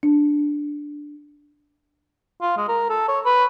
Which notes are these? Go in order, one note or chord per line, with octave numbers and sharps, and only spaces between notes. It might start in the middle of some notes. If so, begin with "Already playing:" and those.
D4
F4
G#3
A#4
A4
C#5
B4